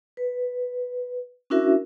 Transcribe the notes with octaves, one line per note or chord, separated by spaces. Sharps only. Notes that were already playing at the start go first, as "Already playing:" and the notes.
B4
C#4 D4 E4 F#4 A#4 E5